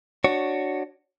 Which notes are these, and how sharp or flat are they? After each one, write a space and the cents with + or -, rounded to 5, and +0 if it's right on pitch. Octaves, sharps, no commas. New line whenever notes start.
D4 +15 F#4 +5 C#5 +0